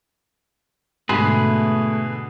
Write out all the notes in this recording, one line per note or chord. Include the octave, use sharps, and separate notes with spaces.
G#2 B2 D3 G#3 A3 G#4 B4